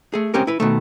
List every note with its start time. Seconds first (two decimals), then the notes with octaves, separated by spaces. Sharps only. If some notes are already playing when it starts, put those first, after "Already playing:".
0.14 A3 G#4
0.34 G#3 C4 C#4 G4 A#4
0.47 E4 B4
0.60 B2 D#3 A3